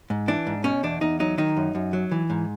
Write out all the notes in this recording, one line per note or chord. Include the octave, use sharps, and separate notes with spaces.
G#2
E3 D4
G#2
B2 C#4
E2 D4
E2 D#4
F#3 D#4
D#3 D#4
F#2
F#2
F#3
E3
G#2